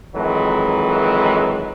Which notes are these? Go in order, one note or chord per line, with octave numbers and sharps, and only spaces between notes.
F2 D#3 E3 F#3 G#3